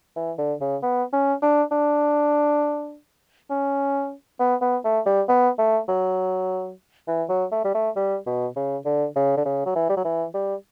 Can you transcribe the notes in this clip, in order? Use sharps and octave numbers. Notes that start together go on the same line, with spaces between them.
E3
D3
C#3
B3
C#4
D4
D4
C#4
B3
B3
A3
G3
B3
A3
F#3
E3
F#3
A3
G3
A3
G3
B2
C#3
D3
C#3
D3
C#3
F#3
E3
G3
F#3
E3
G3